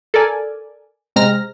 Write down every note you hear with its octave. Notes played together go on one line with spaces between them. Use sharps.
A4 A#4 D5 G#5
C3 G#3 C4 A#5 F6 A#6